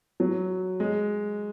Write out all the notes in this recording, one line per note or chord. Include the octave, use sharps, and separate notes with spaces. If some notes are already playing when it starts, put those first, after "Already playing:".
F#3
G#3